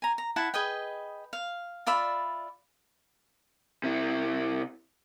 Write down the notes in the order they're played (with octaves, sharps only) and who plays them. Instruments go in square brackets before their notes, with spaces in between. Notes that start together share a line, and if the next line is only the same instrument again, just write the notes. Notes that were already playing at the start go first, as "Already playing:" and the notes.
[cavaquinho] G#5 A#5
A#5
E4 F#5 A5
G#4 B4 D#5 G5
F5
F4 D5 E5 B5
[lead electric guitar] C3 E4